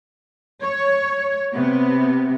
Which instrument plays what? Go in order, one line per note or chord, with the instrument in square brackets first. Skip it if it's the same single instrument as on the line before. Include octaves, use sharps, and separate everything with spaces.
[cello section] C#5
C3 B3